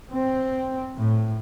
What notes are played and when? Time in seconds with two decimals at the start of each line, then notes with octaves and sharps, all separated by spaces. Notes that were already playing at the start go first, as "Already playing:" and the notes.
0.14 C4
0.98 A2